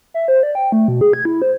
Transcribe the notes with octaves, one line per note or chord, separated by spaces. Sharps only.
E5
C5
D5
G5
A3
B2
G#4
G#6
E4
C5